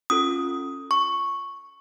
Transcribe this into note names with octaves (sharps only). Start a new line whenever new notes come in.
C#4 F4 A4 D#6
C#6